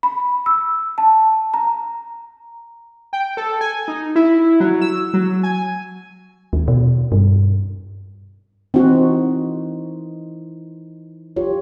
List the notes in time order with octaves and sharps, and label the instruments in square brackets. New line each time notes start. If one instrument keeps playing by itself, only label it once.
[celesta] B5
E6
A5
A#5
[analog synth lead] G5
A4
G#5
D#4
E4
F#3
E6
F#3
G#5
[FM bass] D#2
B2
G2
[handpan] E3 D#4 C5 [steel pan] C4 F#4
[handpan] F4 G4 C#5